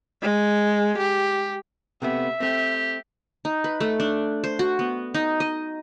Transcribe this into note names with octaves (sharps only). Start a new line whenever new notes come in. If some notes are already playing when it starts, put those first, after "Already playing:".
G#3
G4
C3 A3 B3 E5
A3 C4 G4
D#4
B4
A3
D4
C5
F#4
B3
D#4
D#5